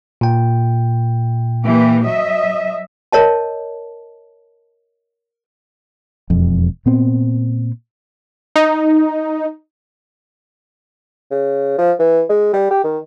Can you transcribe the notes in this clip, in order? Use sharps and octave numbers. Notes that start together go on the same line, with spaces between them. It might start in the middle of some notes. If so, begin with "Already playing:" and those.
A#2 G5
E3 A#3 G4
F#3 D#5 E5
A#4 C#5 D#5 A5
E1 F2
A#2 B3 C4
D#4
C#3
F3
E3
G#3
G3
G4
D#3